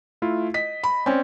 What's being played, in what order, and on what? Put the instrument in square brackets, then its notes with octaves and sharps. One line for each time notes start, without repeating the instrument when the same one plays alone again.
[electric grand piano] A3 E4 F4
[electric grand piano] D#5 [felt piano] B6
[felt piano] B5
[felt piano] C4 C#4 [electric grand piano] D5